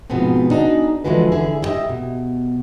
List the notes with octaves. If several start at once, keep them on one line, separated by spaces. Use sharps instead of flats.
G#2 B2 F3 B3 C4
B3 D4 D#4 F#4 G#4
D3 E3 F3 G#3 F#4 B4
D3 E4 G#4
E4 F#4 G4 D#5 E5
B2